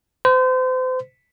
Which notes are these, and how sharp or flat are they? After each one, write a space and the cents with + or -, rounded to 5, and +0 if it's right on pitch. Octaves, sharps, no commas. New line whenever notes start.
C5 -35